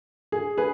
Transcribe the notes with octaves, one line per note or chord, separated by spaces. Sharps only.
G#4
G#4 B4